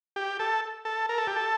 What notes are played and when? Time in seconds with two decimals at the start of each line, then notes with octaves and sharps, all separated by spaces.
0.16 G4
0.39 A4
0.85 A4
1.09 A#4
1.18 A4
1.27 G4
1.36 A4